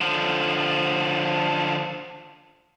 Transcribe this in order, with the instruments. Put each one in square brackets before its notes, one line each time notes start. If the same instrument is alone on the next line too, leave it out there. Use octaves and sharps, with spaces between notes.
[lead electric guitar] D3 F3